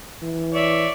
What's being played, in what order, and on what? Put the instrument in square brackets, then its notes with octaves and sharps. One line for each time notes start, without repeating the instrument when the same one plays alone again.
[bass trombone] E3
[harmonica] C#5 D5 E5